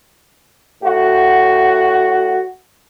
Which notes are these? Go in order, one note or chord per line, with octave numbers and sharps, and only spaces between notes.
A2 F#4